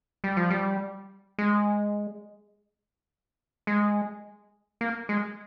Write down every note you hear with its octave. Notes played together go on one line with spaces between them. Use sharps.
G3
F3
G3
G#3
G#3
A#3
G#3